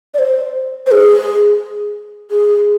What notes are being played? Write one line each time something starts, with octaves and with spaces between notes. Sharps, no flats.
D5
C5
C5
G#4
G#4